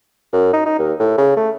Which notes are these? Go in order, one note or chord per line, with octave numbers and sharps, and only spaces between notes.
F#2
D#4
D#4
D#2
A2
C#3
A3